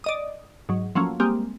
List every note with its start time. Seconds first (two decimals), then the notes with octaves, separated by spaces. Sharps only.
0.04 D5 D#5 D#6
0.69 G#2 F#3
0.95 F3 F#3 A3 A#3 C#4
1.20 G3 G#3 A#3 C4 G4